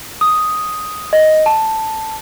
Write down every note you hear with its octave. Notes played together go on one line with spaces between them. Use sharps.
D#6
D#5
A5